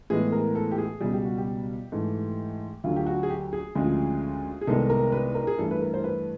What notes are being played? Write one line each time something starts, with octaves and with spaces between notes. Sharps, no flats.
A2 E3 G#3 B3 G#4
A#4
A4
G4
G#4
C#2 B2 G3 G#4
G4
F#4
G4
G#2 E3 A3
D2 D3 F#3 F4
G4
F#4
G#4
G4
G#4
D2 C#3 F3 G#3
G#4
C2 C3 D#3 G#3 B3 A4
A#4
B4
A#4
G#4
G2 E3 A3 A4
B4
A#4
C5
B4